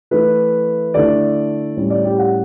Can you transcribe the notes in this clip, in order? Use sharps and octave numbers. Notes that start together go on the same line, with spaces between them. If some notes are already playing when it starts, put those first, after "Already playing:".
E3 A3 E4 B4
D3 A3 E4 D5
A2 G3 C#4
D5
G4
F#5